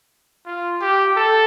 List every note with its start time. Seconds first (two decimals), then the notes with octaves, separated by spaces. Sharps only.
0.46 F4
0.81 G4
1.16 A4